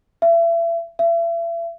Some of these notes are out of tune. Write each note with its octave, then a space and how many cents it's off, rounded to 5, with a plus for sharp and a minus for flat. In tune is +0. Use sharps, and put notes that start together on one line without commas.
E5 +35
E5 +40